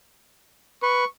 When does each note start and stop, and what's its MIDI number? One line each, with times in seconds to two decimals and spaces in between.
0.82 1.05 71
0.82 1.07 85